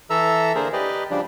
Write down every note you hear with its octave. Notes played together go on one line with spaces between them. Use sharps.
E3 A4 E5 A#5 E6
D3 A#3 G#4 A#4 C5
G4 B4 D5 D#5
C#3 F3 G3 D4